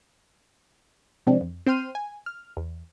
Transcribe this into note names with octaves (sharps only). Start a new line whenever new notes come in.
C3 F3 G#3 C4 D4
F2
C4 C5 G5 C6 F6 D#7
G#5
F6
E2